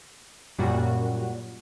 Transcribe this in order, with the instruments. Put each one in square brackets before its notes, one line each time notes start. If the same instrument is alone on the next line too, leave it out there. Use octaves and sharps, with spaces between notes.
[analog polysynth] F#2 A#2 G3 F#4